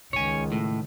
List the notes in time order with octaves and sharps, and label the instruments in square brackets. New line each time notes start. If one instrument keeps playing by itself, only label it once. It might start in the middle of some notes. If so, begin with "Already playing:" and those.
[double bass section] C#2 D#3 [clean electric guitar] C#5 G#5
[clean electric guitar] A2